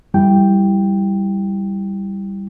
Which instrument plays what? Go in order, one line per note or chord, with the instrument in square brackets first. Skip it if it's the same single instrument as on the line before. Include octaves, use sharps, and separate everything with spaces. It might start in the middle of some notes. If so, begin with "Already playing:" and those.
[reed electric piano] F2 G3 E4 G5